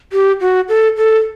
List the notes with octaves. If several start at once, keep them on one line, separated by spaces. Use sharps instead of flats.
G4
F#4
A4
A4